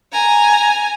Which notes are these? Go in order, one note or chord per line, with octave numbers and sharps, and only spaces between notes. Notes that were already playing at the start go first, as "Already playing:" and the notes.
G#5 A#5